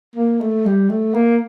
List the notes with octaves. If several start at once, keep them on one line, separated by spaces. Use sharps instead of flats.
A#3
A3
G3
A3
A#3